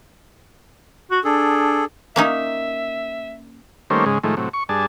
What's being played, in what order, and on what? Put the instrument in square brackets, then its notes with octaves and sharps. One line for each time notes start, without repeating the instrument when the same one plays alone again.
[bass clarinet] F#4
[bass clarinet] D4 [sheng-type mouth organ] G#4 A4
[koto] A#3 C#4 D#4 [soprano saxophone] E5
[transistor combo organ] D#3 G3 A3 A#3 C#4 C5
G#2 C#3 G#3
A2 D#3 F3 G#3 A3
A2 C3 F#3
C#6
G2 D4 G#4 A5